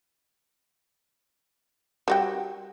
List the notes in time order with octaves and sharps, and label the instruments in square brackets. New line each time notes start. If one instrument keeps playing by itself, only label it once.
[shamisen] G3 F#4 G5